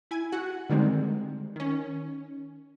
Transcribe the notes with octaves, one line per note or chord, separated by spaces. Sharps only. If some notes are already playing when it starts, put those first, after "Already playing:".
E4 G#5
F#4 F#5
D3 D#3 G3 G#3 C4
D#3 C#4